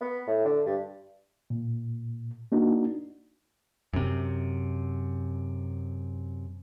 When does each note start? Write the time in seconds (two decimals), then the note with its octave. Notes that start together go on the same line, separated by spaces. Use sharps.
0.01 B3
0.27 A2
0.45 D3
0.66 G2
1.50 A#2
2.52 A#3 D4 D#4 F#4
3.93 F#2 C3